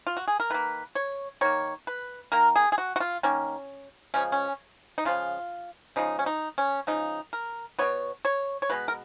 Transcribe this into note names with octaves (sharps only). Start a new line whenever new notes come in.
F4
F#4
G#4
A#4
D#3 A#3 B4
C#5
D#3 A#3 C#5
B4
D#3 A#3 A#4
G#4
G#4
F#4
F#4
F4
D#3 A#3 C#4
C#3 F3 G#3 C#4
C#4
D#4
C#3 F3 G#3 F4
C#3 F3 G#3 D#4
C#4
D#4
C#4
C#3 F3 G#3 D#4
A#4
B2 G#3 B3 C#5
C#5
C#5
B2 G#3 B3 B4
A#4